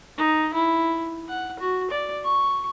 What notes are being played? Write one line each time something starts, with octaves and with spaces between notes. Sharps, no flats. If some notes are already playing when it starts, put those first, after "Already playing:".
D#4
E4
F#5
F#4
D5
C#6